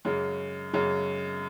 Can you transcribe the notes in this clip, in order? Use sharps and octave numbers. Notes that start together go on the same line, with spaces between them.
F#2 C#3 G#3
F#2 C#3 G#3